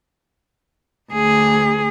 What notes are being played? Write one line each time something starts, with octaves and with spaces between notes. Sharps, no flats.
D2 G#4